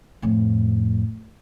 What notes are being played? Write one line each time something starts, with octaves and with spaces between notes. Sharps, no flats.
F2 A2